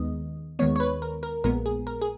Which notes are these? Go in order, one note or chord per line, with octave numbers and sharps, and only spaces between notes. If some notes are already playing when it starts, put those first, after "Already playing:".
Already playing: D#2 D#3 G#3 B3 D#5
D#2 D#3 G#3 B3 C#5
C#5
B4
A#4
A#4
A#1 A#2 G#3 B3 A#4
G#4
A#4
G#4